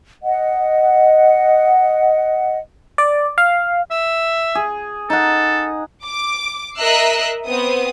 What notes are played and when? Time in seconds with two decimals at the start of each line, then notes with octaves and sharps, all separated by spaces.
0.23 D#5 F#5
2.98 D5
3.38 F5
3.91 E5
4.55 G#4
5.10 D#4 A4 F#5
6.04 D6
6.77 A#4 D#5 E5 E6 F#6 C7
7.47 B3 C4 D#6